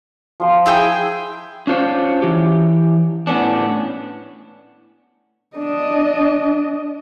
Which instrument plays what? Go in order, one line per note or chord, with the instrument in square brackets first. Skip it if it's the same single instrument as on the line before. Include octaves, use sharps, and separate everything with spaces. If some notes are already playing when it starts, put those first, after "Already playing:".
[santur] F3 C6
[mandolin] E4 G#4 G5
[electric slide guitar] C#4 D4 F4 C5 C#5
E3 G4
A2 B3 C#4 D4
[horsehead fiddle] D4 D#5